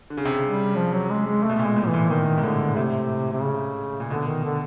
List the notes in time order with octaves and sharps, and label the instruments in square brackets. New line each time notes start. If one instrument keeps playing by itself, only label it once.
[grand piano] D3
C#3
C3
C#3
[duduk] G3
F3
F#3
G#3
G#3
A3
[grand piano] B2
A#2
[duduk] G#3
[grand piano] A2
[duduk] E3
[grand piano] A#2
[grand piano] A#2 [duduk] D#3
[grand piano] G#2
[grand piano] A2 [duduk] D3
[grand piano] A2 [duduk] C3
[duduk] C3
C#3
[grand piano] A#2
[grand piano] B2 [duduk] D3
[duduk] D#3
D3